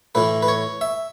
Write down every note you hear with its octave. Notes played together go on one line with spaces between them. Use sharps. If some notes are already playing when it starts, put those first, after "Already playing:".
A2 E3 B4
B4
C#5
E5